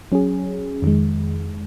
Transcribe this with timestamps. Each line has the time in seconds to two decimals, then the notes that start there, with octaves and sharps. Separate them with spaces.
0.12 F#3 C#4 G#4
0.82 F2 D#3 G#3